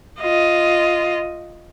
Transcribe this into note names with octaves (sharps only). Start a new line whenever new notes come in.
F4 D#5